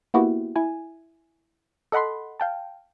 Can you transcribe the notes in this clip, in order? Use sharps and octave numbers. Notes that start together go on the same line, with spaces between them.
A#3 B3 E4 F#4 G4
E4 G#5
A4 D#5 F#5 B5 C6
F5 G5 A5